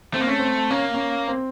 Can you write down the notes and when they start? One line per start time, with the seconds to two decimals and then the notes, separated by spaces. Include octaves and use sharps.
0.14 A3 C4
0.21 A#3
0.27 A3 C#4
0.39 C4
0.70 A#3 C#4
0.94 C#4
1.28 C4